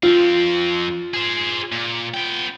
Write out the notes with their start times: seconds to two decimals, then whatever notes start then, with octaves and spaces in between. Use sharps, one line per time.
0.03 F2 C4 F4
1.14 G#4 C5
1.72 A#2
2.14 B3 G5